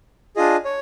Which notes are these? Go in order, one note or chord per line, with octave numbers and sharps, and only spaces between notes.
D4 F4 G#4 D#5
C#5